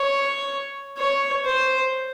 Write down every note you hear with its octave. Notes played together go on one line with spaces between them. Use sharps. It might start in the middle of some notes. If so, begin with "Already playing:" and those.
Already playing: C#5
C#5
C5